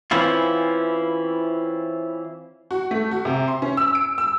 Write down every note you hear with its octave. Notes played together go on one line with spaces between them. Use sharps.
E3 C4 C#4 E4 F4
F#4
A3
F#4
C3
C6
C#4
E6
D7
E6